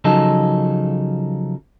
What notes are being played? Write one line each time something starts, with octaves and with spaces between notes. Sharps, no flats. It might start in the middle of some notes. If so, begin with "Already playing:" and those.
C#3 F3 F#3 D#4 A4